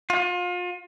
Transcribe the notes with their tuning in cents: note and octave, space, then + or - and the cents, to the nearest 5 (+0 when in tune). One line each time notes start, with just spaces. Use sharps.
F4 +35